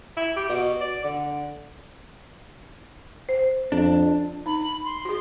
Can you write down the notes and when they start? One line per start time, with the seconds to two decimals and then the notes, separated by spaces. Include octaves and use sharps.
0.17 E4
0.36 G4
0.49 B2
0.81 D5
1.04 D3
3.29 C5
3.72 F2 D4
4.46 D#4 B5
4.84 C6
5.05 F#4 G#4